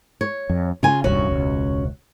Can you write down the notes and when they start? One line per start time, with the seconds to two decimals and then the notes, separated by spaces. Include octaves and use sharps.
0.21 C#5
0.50 F2
0.83 C#3 F4 G#5
1.04 D#1 C2 G2 C#4 F#4
1.27 E1 C#2